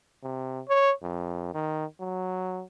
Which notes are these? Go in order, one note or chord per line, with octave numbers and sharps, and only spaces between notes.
C3
C#5
F2
D#3
F#3